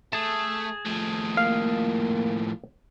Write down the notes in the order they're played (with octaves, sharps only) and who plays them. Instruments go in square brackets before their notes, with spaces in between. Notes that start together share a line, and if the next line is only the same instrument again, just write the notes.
[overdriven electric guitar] A3 [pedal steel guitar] G#4 A5
[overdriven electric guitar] A2 F3
[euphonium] A#3 [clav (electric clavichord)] F5